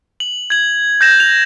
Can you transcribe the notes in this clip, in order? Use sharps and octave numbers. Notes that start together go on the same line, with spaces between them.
F#7
G#6 F#7
G6 A#6 E7
F7